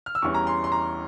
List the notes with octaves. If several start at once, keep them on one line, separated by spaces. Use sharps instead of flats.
F6
E6
E2 E3 G3 C#4 C#6
A#5
C6
C6
A#5